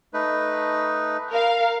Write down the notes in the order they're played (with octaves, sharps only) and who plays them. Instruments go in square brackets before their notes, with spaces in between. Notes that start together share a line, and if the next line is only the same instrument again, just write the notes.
[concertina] A3 D#4 B4
[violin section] A#4 F5